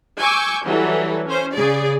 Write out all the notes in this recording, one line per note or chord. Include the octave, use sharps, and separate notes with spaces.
G#5 C#6 D6 E6 G6
E3 F#3 G3 A4
C#4 C5
C#3 G#4 D5